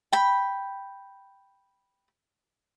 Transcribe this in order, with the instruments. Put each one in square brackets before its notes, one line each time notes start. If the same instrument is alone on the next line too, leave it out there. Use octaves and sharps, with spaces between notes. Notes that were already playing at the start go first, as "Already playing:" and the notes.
[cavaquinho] G5 B5